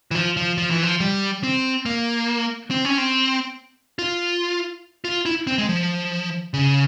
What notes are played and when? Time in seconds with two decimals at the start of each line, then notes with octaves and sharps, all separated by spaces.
0.11 E3
0.15 F3
0.37 F3
0.58 F3
0.71 E3
0.83 F3
1.00 G3
1.43 C4
1.86 A#3
2.71 C4
2.85 C#4
2.98 C4
3.99 F4
5.05 F4
5.25 E4
5.47 C4
5.58 G#3
5.69 F3
6.54 C#3